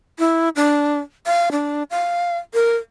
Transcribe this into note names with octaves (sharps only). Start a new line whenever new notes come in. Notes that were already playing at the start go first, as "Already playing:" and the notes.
E4
D4
F5
D4
F5
A#4